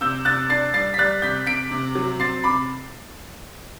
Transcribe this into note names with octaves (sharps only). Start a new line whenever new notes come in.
C3 E6 G6
C3 F#6 A6
D4 A6 C7
G3 A6 C7
B6
G3 F#6 A6
C3 G6 B6
C3 B6 D7
C3
F#3
C4 A6 C7
C3 B5 D6